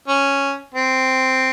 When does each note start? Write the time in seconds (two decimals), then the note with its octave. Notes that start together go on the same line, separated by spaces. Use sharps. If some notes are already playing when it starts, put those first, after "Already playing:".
0.08 C#4
0.74 C4